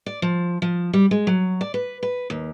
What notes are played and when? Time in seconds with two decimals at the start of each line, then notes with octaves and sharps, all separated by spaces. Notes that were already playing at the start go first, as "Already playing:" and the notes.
0.06 D5
0.22 F3
0.62 F3
0.93 G3
1.11 G#3
1.27 F#3
1.61 D5
1.74 B4
2.03 B4
2.30 D#2